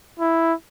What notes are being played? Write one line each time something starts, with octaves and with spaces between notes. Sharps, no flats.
E4